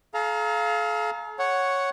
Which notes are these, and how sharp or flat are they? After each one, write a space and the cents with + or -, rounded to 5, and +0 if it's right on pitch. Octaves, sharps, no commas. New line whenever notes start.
A4 -45 F5 +0 A#5 +0
C#5 +0 F#5 +0